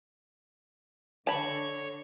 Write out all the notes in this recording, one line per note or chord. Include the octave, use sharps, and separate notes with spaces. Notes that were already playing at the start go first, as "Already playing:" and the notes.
D3 C#5 A5 B5